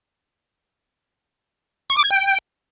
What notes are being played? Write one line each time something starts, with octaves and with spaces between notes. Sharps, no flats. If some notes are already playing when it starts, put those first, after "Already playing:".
C#6
D6
G#6
G5